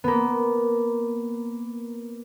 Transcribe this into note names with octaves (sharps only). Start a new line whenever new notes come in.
A#3 B3